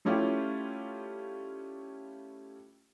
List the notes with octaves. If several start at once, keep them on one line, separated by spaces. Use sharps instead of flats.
G3 A3 C#4 E4 F4 G4